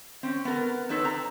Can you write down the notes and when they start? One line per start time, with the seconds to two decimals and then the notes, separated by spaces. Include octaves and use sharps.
0.23 C4 C#4
0.45 B3 A#4
0.89 C4 D#4 A4 B4 C#5
1.04 C4 A#5